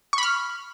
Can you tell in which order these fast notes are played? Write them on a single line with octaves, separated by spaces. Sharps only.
C#6 B5 F6